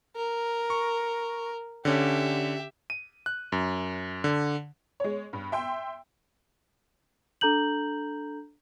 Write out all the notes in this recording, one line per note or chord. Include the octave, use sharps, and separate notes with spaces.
A#4
C#6
D3 C#4 G4 E5
D#7
F#6
F#2
D3
G#3 C#5
G2
E5 G5 C6
D4 A4 A#5 G6 F#7